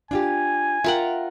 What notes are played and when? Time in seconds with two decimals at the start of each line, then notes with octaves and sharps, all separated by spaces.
0.11 D4 F4 G4 G#5
0.84 F4 A#4 E5 F#5 G5